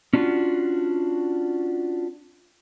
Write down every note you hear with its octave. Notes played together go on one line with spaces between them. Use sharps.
C#4 D4 F4 F#4